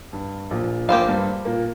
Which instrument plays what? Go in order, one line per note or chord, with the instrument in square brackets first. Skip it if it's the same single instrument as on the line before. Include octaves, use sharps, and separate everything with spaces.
[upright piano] G2
A#1 A#2
[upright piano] A#1 A#2 [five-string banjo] A#3 G4 C5 F5
[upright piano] G2 G3
A#2 A#3